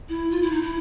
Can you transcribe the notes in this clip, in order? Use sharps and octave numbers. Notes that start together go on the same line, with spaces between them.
E4
F4
E4
D#4
E4